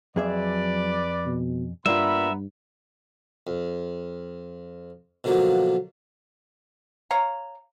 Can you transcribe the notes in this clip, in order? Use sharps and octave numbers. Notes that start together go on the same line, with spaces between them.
F2 F#3 G#4 B4 D5 E5
B2
G2 G3 A#3 B3 F4 E5 A#5 B5
F2
B2 D3 F3 F#3 A#3
C#5 F5 A#5